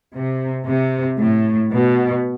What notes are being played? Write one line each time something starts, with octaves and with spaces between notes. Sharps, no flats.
C3
C3
A2
B2